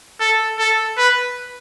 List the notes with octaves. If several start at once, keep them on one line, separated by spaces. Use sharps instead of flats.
A4
A4
B4